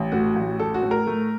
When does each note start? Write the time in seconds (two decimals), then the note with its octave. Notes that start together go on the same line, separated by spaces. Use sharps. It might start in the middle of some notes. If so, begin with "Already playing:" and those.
Already playing: A1
0.12 A2 F#4
0.35 A1
0.59 A3 A4
0.74 F#4
0.83 A2
0.91 A#4
1.07 A3